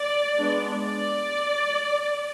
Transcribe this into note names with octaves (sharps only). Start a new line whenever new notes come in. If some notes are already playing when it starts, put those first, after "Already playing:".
Already playing: D5
G#3 B3 D4
D5